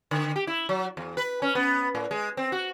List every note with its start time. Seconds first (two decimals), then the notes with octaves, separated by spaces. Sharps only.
0.11 D3
0.36 G4
0.47 E4
0.69 F#3
0.97 E2
1.17 B4
1.42 C#4
1.55 B3
1.95 A2
2.11 G#3
2.37 C4
2.52 F#4